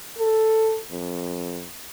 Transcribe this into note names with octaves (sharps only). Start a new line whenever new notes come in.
A4
F2